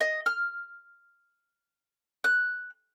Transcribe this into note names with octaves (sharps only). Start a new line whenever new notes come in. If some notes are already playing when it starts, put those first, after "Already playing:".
D#5
F6
F#6